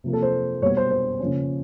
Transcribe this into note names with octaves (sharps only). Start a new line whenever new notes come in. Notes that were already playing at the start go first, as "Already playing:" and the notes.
C3 F3 A#3
A4
C5
B2 G3 B3 C#5
C5
C5
C#3 F3 A#3 C#4